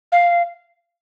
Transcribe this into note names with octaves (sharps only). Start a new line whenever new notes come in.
F5